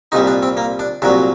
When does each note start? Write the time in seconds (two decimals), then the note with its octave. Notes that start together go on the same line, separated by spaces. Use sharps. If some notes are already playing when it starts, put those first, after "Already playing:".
0.12 C2 A#2 G3 D#4
0.27 D4
0.43 C4
0.57 A#3
0.79 D4
1.02 C2 A#2 F#3 D4